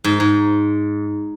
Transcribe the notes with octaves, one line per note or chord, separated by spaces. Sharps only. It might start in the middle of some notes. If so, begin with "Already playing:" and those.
G#2
G#2